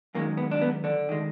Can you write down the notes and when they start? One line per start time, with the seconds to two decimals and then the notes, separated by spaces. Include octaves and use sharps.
0.14 F#2 D#3 G#3 A#3
0.37 B3
0.51 D4
0.62 B3
0.84 D3 D4
1.09 D#3 G#3